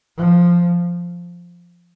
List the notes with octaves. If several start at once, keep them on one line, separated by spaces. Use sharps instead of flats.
F3